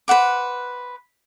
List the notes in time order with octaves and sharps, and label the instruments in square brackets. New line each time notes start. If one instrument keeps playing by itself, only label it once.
[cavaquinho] B4 C5 F#5 D6